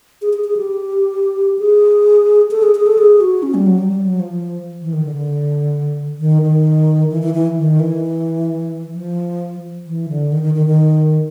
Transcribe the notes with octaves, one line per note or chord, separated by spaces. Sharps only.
G#4
G#4
G#4
G4
G#4
A4
G#4
G#4
A4
G#4
F#4
C#4
G3
F#3
G3
G3
F#3
F3
E3
D#3
D3
D3
D#3
D#3
E3
E3
E3
D#3
E3
F3
E3
D3
D#3
D#3
D#3
D#3